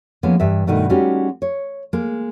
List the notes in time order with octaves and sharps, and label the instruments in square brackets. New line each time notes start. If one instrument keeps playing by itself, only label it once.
[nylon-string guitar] F3 G#3 A#3 B3 C#4
G2 E3 E5
G2 B2 D#3 A3 D#4
G3 G#3 C#4 D#4 F#4 G4
C#5
G#3 A#3